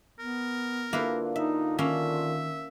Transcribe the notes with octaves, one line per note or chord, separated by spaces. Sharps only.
B3 A#4
D3 A#3 D4 E4 F4 B4
D#4 E5
D#3 A#3 C#4 E5